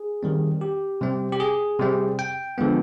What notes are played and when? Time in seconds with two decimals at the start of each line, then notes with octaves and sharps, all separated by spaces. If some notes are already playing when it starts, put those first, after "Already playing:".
Already playing: G#4
0.23 D#3 G3 C4
0.61 G4
1.01 C3 G3 C4
1.32 G4
1.40 G#4
1.79 C3 G3 C4
2.19 G5
2.58 D3 F3 G#3 B3